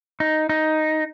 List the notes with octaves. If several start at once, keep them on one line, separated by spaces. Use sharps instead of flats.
D#4
D#4